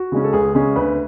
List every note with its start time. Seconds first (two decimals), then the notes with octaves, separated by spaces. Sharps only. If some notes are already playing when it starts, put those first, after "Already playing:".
Already playing: F#4
0.12 C#3 G#3 C#4
0.24 A4
0.33 C#2 G#4
0.55 C#3 G#3 C#4 G#4
0.76 D2 B4